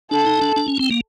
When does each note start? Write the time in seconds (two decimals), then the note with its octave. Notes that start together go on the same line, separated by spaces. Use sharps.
0.11 D4 A4
0.26 D#4
0.41 D4
0.56 D4
0.68 C#4
0.79 C4
0.91 A#3